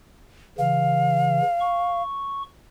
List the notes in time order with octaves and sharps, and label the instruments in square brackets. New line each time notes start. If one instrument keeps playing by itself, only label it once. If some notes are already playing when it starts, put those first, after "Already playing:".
[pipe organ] C#3 E3 [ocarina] F5
[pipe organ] C#6